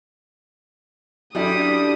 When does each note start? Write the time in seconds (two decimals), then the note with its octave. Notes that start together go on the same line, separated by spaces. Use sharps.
1.35 F#2 F#3 G3 D4 E4 A4 D#6